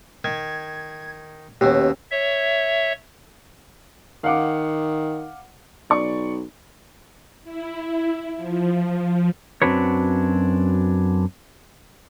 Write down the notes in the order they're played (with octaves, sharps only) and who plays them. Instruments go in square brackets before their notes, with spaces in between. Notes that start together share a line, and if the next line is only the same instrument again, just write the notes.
[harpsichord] D#3 [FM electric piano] G#6
[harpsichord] D#2 B2 [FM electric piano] C#4 G4
[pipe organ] C#5 E5
[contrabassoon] D#3 [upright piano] F5 F#5 D6
[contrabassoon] B1 [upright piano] D5 C#6
[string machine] E4
F3
[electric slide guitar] F#2 C4 D4 F#4 B4 C#5